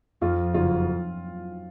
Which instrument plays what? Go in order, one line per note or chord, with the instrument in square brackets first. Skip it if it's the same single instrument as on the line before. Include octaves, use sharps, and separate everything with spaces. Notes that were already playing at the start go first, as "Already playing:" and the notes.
[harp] F2 [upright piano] F4
[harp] F#1 [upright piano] F4